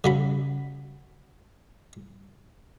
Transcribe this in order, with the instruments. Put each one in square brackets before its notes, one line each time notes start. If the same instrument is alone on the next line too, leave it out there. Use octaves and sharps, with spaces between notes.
[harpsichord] C#3 F#3 B5